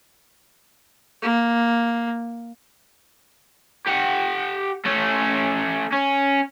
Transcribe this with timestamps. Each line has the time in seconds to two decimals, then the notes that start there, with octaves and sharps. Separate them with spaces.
1.22 A#3
3.87 G4 F#5
4.85 A3 C#4
5.93 C#4